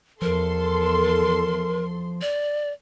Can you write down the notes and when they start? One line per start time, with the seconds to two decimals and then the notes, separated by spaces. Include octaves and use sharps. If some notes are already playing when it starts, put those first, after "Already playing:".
0.22 E2 F3 A4 A#4 C6
2.21 D5